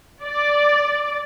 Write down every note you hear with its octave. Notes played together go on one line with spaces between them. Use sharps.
D5